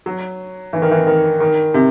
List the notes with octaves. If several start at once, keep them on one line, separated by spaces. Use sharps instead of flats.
F#3
E3
D#3
E3
D#3
D#3
C3